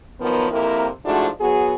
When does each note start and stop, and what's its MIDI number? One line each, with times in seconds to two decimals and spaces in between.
0.20 0.50 51
0.20 0.50 53
0.20 0.50 54
0.20 0.50 59
0.50 0.86 41
0.50 0.86 48
0.50 0.86 58
0.50 0.86 64
0.50 0.86 70
1.04 1.26 44
1.04 1.26 53
1.04 1.26 57
1.04 1.26 62
1.04 1.26 64
1.04 1.26 66
1.40 1.75 54
1.40 1.75 59
1.40 1.75 66
1.40 1.75 68